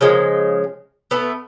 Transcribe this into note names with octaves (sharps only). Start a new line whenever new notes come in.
C#3 F3 G#3 A#3
A3 B3